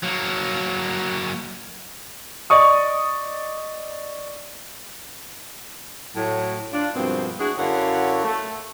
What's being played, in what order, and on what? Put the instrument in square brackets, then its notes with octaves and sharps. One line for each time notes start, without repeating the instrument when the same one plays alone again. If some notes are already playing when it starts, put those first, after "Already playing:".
[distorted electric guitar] F#3 A#3
[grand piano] D5 D#5 C#6 D#6
[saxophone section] A2 F#3
D4 F4
G2 B2 F3 G#3 A#3 C4
D4 E4 F#4 G#4
F#2 D3 E4 C#5 F5 F#5
A3